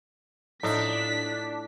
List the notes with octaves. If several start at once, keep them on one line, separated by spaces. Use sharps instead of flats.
A2 D4 D#4 F4 B6